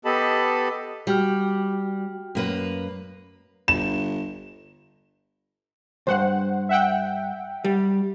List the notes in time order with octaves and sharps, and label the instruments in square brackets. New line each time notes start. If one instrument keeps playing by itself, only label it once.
[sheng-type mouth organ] B3 G4 A4 D#5 A5 B5
[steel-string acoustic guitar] G3 [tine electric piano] F#4 G5 F6
[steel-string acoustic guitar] F#2 A#3 B4
[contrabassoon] G1 [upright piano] E7
[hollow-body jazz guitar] D2 G2 [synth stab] C5 F#5
[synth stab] E5 F#5 G5
[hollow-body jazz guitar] G3